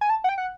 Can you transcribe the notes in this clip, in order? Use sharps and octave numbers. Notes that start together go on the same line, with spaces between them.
G#5
A5
F#5
G5
F#5